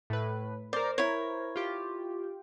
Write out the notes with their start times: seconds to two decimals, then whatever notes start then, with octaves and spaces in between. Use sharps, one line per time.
0.10 A2 B4
0.73 A#4 C5 D5
0.98 E4 C#5
1.56 F4 G4